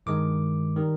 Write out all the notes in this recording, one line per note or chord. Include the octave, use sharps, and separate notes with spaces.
G2 D#3 G#3 D6
D#3 G3